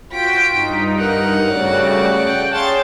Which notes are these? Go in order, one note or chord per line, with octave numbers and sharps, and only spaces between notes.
F4 F#4 G5 B6 D7
G2 D#4
A#4 F#5
C#3 G3 A3 F#4 D5
G5
G#4 C#5 F5 G5 A5 C6 A6